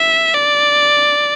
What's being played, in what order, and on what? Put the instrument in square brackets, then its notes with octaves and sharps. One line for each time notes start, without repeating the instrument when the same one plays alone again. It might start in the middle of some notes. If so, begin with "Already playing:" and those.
Already playing: [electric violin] E5
D5